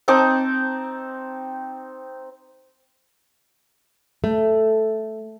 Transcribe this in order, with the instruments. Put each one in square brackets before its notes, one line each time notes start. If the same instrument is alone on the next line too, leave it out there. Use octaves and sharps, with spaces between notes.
[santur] C4 D#4 A5 D6
[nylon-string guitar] A3